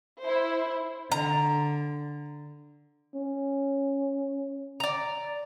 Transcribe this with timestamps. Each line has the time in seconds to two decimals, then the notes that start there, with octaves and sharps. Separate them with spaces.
0.23 E4 C5
1.12 D3 A#5
3.15 C#4
4.80 D5 A#5